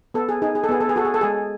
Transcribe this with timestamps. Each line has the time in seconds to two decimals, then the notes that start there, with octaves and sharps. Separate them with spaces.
0.14 B3 A4
0.29 G#4
0.42 D#4 G#4
0.55 G#4
0.64 A4
0.69 B3 G#4
0.81 A4
0.89 G#4
0.96 F#4 A4
1.05 G#4
1.14 A4
1.21 G#3 G#4